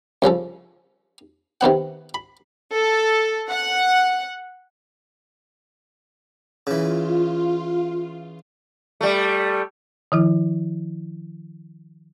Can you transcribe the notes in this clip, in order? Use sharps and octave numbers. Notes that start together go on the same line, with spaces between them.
C2 C#3 F3 A4
C3 D#3 B3 F#5
B5
A4
F#5
C#3 E3 F4
G3 A3
D#3 F3 E4